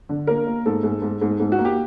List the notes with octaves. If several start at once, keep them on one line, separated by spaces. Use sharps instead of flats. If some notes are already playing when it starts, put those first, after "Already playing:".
D3
A#3 A#4
A#3
G#2 A4
G#2
G#2
G#2
G#2
F#4
A#3
G4